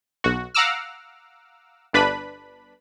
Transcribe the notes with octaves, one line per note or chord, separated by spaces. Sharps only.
B1 F#4
F5 F#5 A#5 D6 E6 F6
G1 D4 B4 B5